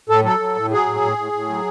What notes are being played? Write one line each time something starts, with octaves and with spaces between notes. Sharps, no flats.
A2 A4
F#3 A4
F#3
A2
F#3 G#4
A2
A2
A2
A2
F#3